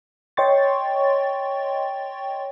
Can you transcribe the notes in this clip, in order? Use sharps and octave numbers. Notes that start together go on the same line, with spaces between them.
C#5 D#5 G5 C6 C#6 A6